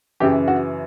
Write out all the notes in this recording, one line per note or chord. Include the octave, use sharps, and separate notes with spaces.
F#2 C#3 E3 G4
F#4